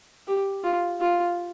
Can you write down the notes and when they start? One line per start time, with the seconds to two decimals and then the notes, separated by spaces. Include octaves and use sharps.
0.27 G4
0.64 F4
1.01 F4